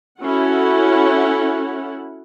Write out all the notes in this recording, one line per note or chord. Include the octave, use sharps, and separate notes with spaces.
C#4 E4 F#4 A4 F#5